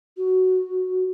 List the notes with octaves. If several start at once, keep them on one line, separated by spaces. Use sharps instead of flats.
F#4